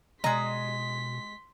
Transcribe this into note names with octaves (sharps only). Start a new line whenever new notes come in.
B2 G#3 D#5 A#5 C6 B6